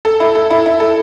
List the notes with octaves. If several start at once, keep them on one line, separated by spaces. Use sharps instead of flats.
A4
E4
A4
E4
E4
A4